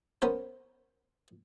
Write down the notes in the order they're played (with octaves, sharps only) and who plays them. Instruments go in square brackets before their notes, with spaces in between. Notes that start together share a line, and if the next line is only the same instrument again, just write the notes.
[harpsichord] B3 C#4 A#4 C5